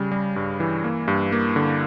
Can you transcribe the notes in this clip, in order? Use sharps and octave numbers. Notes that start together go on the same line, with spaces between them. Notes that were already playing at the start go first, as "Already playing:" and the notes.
Already playing: C#3 G3
G3
G2
E3
A#3
G2
A#3
D3